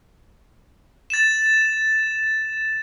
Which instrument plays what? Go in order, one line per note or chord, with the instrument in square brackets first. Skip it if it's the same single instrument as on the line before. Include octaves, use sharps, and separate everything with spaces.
[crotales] A6 E7